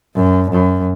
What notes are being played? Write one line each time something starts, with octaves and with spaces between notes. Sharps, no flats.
F#2
F#2